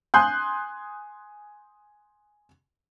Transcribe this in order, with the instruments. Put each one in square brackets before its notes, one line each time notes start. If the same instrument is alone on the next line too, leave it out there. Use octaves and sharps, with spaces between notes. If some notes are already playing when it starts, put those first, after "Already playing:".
[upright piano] G#5 C6 D#6 F#6 G6